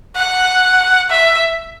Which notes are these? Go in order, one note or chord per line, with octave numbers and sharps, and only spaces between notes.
F#5
E5